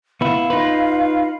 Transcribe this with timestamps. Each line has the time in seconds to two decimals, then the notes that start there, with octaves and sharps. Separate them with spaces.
0.21 B3 E4 F5
0.50 D#4 F4 B4